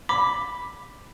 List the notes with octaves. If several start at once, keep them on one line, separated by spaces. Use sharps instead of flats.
B5 D6